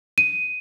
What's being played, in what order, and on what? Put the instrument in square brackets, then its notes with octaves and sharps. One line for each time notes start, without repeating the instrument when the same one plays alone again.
[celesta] D#7